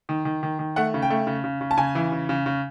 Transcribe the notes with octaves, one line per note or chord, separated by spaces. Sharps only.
D#3
D#3
D#3
D#3
A3 F#5
C#3
G5
A3
C#3
C#3
C#3
A5
C#3 G#5
E3
C#3
C#3
C#3